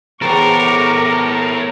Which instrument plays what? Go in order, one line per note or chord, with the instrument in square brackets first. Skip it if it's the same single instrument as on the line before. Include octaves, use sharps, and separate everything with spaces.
[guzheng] E2 C5 G5 [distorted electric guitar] A4 C#5 [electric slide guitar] A#4 [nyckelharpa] C#6 D6